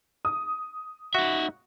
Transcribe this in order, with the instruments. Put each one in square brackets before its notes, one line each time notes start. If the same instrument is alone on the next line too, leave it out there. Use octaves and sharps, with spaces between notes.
[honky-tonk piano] D#6
[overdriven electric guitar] D#4 E5 [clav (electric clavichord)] F#4